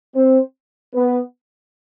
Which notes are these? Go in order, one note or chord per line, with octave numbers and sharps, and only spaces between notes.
C4 C5
B3 B4